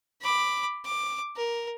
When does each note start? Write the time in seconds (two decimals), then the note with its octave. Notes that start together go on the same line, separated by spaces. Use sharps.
0.22 B5 D6
0.85 D6
1.37 A#4